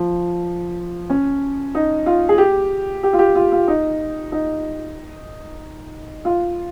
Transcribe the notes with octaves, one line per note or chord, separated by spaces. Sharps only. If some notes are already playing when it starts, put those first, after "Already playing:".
Already playing: F3
C#4
D#4
F4
G#4
G4
G4
F4
G4
F4
F4
D#4
D#4
F4